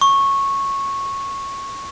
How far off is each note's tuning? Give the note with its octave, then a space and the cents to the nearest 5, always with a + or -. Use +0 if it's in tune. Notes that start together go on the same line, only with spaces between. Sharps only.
C#6 -10